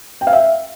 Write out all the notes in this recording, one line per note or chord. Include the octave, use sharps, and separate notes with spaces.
G5
F5
E5